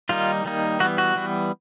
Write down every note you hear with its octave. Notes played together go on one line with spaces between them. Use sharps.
D#3 G3 A#3 D#4 F4
D#3 G3 A#3 D#4
E3 G3 B3 F#4
F#4
E3 G3 B3